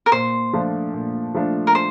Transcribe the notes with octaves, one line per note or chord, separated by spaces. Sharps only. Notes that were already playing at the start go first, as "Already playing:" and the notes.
A#4
A#2 C5
F3 A3 D4 F4
A#2
F3 A3 D4 F4
A#4
C5